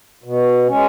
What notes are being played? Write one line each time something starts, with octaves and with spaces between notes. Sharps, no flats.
B2
G#3 C#4